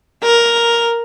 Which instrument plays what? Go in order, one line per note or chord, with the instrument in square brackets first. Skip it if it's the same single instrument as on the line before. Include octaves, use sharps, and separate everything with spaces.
[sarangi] A#4